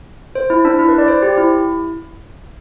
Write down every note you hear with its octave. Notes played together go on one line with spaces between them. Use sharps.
C5
E4
D4
E4
B4
D5
C5
G4
E4